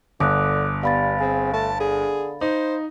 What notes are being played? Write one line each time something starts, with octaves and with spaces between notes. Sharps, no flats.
G1 D3 D6 D#6 F#6
G3 B3 F5 B5 A6
C4 G#4
A3 A5
D3 G#4
D#4 C5